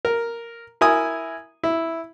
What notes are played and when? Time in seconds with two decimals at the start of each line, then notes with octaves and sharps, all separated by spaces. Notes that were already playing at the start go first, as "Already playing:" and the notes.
0.05 A#4
0.81 E4 A#4 G#5 D#6
1.63 E4